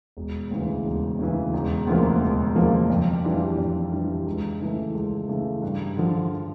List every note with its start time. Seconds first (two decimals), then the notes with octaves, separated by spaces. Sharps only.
0.17 E1
0.51 D2 C#3 E3
0.85 E1
1.19 D2 C#3 E3
1.53 E1
1.87 D2 C#3 F3 A#3
2.21 E1
2.56 D2 C#3 F3 A#3
2.90 F2
3.24 E3 G3 D4 F4
3.58 F2
3.92 E3 G3 D4 F4
4.26 C#2
4.60 C#3 E3 A3
4.95 C#2
5.29 C#3 E3 A3
5.62 G2
5.97 D3 F3